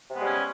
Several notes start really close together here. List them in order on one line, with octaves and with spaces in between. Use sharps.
C3 B3 G#3 G3 C#4